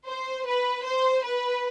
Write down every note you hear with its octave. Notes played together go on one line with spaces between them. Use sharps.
C5
B4
C5
B4